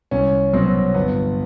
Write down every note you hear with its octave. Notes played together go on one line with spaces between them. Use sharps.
C2 C#4
B2 F#3 C4
G1 B3